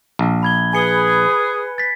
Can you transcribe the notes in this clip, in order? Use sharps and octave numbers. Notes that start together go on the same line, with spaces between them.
A#1
B5 G#6 G7
G#4 B4 G#5 C#7 G7
A6 B6